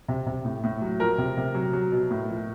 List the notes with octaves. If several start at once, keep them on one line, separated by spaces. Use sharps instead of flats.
C3
C3
A2
A2
F#3
F3 A#4
C3
C3
F#3
F#3
B2
A2
F3